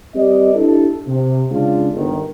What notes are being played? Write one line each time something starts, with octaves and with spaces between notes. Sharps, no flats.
G3 C4 G4 B4 D5 D#5
D4 E4 G4 A4
C3
C#3 G#3 C#4 D4 F4
G1 D#3